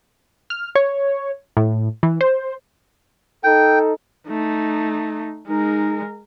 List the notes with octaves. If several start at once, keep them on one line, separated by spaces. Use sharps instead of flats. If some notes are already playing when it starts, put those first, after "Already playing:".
F6
C#5
A2
E3
C5
D#4 A4 G5
A3 D#4
G#3 D#4 A#4